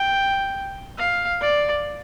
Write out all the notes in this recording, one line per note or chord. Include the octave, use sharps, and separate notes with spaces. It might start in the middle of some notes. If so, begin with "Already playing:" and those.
Already playing: G5
F5
D5